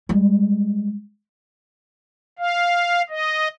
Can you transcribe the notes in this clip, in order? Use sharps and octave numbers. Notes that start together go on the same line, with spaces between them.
G3 G#3
F5
D#5